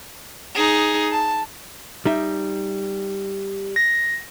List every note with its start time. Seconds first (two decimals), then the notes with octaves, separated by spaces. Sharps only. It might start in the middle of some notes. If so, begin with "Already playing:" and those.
0.55 D#4 G#4
1.11 A5
2.06 G3 D#4 E5
3.76 A#6